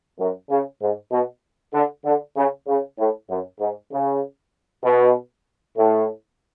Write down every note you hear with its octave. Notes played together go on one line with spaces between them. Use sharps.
F#2
C#3
G#2
B2
D3
D3
C#3
C#3
A2
F#2
G#2
C#3
B2
A2